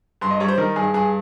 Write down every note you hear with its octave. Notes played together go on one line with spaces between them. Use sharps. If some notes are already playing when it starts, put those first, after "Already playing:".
G2 C6
D#5
G3 C#5
C5
D#3 A#4
G2 G#4
G2 G#4